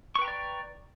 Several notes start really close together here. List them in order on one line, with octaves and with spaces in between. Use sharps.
C#6 B4 G5 A#5 D5